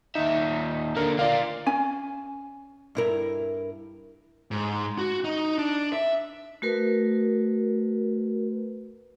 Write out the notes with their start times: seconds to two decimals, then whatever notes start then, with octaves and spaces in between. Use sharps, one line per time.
0.15 D#2 D#4 E5
0.97 D3 A#3 A#4
1.19 A#3 F4 D5 F5
1.66 C#4 G#5
2.95 G2 E4 A#4
4.51 G#2
4.98 F#4
5.24 D#4
5.58 D4
5.93 E5
6.62 A3 F#4 A#4 B4